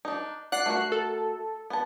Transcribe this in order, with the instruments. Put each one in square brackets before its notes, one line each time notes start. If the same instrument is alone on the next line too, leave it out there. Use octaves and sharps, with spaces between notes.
[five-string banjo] D4 D#4
[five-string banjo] D5 F#5 [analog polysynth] F#6 C7
[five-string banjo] A3 F#4 A#4
[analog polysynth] A4
[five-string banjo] B3 A5